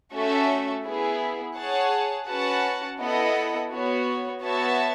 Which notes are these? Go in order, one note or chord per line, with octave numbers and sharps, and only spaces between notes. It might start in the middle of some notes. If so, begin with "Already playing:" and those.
A3 C#4 F#4 A4 E5
B3 E4 G#4
G#4 C#5 F#5 A5
C#4 F#4 B4 F#5 A5
B3 E4 A4 D#5 F#5
B3 F#4 C#5
B3 F#4 C#5 E5 A5